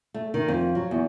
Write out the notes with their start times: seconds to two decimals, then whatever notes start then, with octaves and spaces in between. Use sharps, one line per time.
0.14 A3
0.34 D#3
0.48 F2
0.75 F#3
0.91 E2